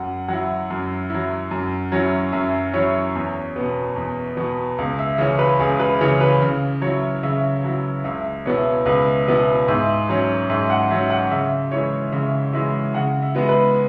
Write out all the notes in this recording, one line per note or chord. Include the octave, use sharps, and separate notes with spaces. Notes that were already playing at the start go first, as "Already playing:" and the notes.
Already playing: F#2 F#5
F#3 E4 F#5
F#2
F#3 E4
F#2
F#3 C#4 E4
F#2 E5
F#3 C#4 E4 C#5
E2
B2 B3
E2
B2 B3
C#2
E5
C#3 E3 C#4
B4
C#2 G#4
B4
C#3 E3 C#4 C#5
B4
C#3
F#3 E4 C#5
C#3 E5
F#3 E4
C#2 E5
B2 B3 E4 C#5
C#2 B4
B2 B3 E4
G#2 E5
F#3 C#4
G#2 E5
F#5
F#3 C#4 E5
F#5
C#3 E5
E3 G#3 E4 C#5
C#3 E5
E3 G#3 E4 E5
C#3 F#5
E5
G#3 B3 E4
B4